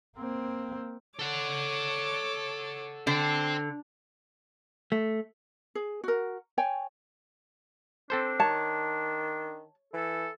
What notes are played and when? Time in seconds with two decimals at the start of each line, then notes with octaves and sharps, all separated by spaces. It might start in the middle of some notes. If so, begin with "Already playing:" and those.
0.17 A#3 C4
1.19 A4 C#5 F#5 D6
3.07 D3 C5 G5
4.92 A3
5.75 G#4
6.04 F#4 A#4
6.58 C#5 G5 G#5
8.10 C4 D4 A4 C5
8.40 D#3 C#5 A5
9.94 E3 A4